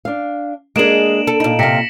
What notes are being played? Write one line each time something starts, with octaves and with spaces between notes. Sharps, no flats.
D4 F5
G#3 A#3 D4 G#4 D7 E7 F#7
A4
A#2 D#4
C3 F5 A#6 B6 C#7